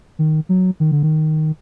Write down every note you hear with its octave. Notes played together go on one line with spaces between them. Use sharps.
D#3
F#3
D#3
D3
D#3